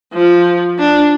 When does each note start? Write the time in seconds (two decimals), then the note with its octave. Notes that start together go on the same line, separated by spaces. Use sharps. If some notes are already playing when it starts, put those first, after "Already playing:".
0.14 F3
0.79 D4